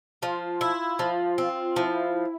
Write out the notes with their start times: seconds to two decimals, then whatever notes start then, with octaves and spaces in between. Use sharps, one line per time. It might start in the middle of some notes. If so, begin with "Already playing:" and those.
0.22 F3 F4
0.61 E4
0.99 F3
1.38 C4
1.76 F3 E4